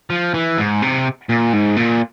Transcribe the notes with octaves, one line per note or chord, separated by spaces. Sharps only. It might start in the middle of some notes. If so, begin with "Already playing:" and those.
F3
E3
G#2
C3
A#2
G#2
A#2